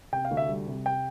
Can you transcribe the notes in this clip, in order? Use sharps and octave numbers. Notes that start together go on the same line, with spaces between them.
C3 G5
F5
D2
E5
G3
C3
G5